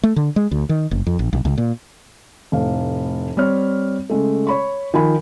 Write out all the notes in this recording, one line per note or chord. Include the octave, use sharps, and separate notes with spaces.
A3
D3
G#3
D2
D#3
F#1
F2
A#1
B1
C#2
A#2
F1 A2 F5
G3 C4 C#5 F6
C#3 G#3 A3
C#5 B5 C#6
D#3 F3 G#5 B5